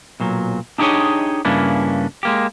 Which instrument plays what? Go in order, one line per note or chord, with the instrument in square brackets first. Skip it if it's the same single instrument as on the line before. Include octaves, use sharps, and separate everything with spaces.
[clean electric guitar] B1 A#2 F#3
D4 D#4 G4 G#4 C#5 D#5
G2 C#3 A#3 C#4 D4 E4
G#3 A#3 G4